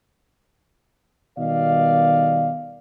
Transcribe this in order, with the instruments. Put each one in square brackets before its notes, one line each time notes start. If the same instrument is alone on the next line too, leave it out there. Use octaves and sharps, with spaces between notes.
[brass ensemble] B2 D#3 G3 D5 D#5 F5